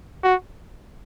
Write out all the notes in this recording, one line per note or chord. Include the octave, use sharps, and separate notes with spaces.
F#4